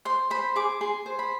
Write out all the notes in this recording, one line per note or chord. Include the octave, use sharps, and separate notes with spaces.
C5 C6
C5 B5
G#4 D6
G#4 C6
C5
B5